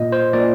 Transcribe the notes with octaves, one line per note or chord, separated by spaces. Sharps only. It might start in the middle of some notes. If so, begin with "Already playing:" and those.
Already playing: A#2 D#5
C5
A#2 D5